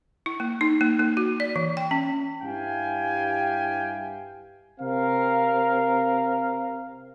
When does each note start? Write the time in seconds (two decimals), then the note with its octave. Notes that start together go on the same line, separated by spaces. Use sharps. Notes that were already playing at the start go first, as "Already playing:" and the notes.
0.26 E4
0.40 A#3
0.61 D#4
0.81 A#3
0.99 A#3
1.17 F#4
1.40 D5
1.56 E3
1.77 G5
1.91 C#4
2.42 G2 E4 G4 F5 G5 G#5
4.80 C3 C4 A#4 F5